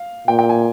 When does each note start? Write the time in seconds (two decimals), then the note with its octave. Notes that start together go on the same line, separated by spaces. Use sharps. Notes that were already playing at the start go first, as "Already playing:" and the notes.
Already playing: F5
0.27 A#2 G5
0.39 G5
0.49 G#5